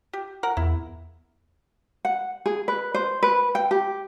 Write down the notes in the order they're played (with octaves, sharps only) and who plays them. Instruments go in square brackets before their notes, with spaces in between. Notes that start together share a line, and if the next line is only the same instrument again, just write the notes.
[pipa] G4
A#4 F#5
[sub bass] E2 [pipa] E4
[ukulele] F#5
G#4
B4
C5
B4
G5
G4